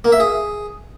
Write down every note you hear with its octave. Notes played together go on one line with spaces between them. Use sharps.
A#3
E5
G#4